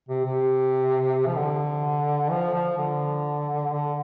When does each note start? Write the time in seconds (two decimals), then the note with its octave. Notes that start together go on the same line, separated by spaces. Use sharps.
0.09 C3
0.25 C3
1.26 F3
1.36 D3
2.31 F3
2.54 F3
2.77 D3
3.73 D3